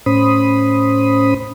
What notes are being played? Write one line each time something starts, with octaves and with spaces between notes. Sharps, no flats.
A2 C#4 C5 B5 D#6